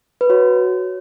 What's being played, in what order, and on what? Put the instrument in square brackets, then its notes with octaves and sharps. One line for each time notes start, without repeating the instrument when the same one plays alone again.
[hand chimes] B4
F#4 C#5